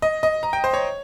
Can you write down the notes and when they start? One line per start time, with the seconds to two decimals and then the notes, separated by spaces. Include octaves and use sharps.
0.02 D#5
0.23 D#5
0.43 A#5
0.53 G5
0.64 C5
0.74 C#5